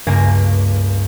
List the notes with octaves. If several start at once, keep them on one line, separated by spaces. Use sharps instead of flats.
C#2 G2 A#3 G#5 A#6